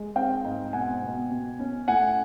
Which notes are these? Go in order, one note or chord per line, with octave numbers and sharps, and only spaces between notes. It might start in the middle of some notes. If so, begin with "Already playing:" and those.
Already playing: G#3
C4 F5 G5
G#2
B2 F#5 G#5
B2
B2
C#4
A2 F#5 G#5